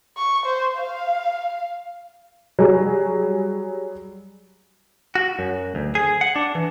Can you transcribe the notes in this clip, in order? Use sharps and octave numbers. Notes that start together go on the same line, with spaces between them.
C#6
C5
F5
F#3 G3 G#4
F#4
F#2
D2
G#4
F#5
D4
E3